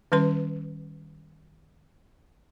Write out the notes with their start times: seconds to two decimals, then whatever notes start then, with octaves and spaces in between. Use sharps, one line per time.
0.12 D#3 G3 C#4 B4 C6